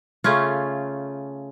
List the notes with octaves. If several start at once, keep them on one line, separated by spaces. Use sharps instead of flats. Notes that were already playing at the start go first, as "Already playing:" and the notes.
C#3 A3 C#4 F4